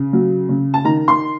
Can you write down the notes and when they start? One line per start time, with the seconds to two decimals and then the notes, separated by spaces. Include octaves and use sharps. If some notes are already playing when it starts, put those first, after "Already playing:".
Already playing: C#3
0.13 F#3
0.49 C#3
0.74 A5
0.84 D#3 A#5
1.08 C6